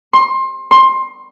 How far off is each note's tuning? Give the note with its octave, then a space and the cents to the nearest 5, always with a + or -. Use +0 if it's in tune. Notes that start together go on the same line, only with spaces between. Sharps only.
C6 +25
C6 +20